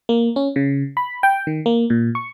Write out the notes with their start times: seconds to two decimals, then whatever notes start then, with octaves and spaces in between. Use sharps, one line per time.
0.09 A#3
0.36 C#4
0.56 C#3
0.97 B5
1.23 G5
1.47 D#3
1.66 A#3
1.90 A#2
2.15 C#6